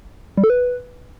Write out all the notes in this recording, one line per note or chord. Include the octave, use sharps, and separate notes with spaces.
G3
A4
B4